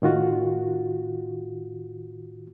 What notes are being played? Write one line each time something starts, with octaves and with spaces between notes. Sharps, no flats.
A2 D#3 F4 F#4